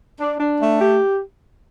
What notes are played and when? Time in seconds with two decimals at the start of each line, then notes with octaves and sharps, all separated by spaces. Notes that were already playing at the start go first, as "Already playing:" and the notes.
0.20 D4
0.40 D4
0.61 A3
0.81 G4